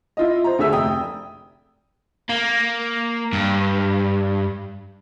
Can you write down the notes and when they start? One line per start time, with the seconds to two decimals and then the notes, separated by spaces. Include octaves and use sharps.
0.17 E4 F4 D#5
0.44 C5 A#5
0.59 D2 G#4 E5 E6
0.73 F1 G5 D#6
2.29 A#3
3.33 G2